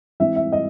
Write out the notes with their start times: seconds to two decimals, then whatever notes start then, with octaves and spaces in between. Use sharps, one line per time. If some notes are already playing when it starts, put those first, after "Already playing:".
0.20 E3 G#3 C4 E5
0.36 E5
0.52 D#5